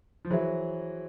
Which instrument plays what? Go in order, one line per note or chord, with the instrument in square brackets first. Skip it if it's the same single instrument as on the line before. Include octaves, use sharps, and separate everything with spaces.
[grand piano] F3
[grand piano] E3 F#3 [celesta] G#4 C5 E5